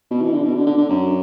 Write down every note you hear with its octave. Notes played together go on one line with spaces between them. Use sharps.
B2
E3
D3
B2
D3
D3
D3
F#2